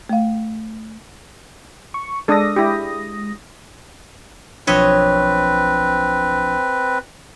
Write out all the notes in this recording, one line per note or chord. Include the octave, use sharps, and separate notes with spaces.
A3 F5
C#6
G#3 D4 A4 D#6 A#6
E4 G4
B1 F3 C4 D4 B4 C#5 D#5 E5